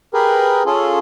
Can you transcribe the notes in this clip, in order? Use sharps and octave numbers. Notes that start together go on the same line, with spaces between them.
G4 G#4 A#4 B4
C#4 F4 G#4 A4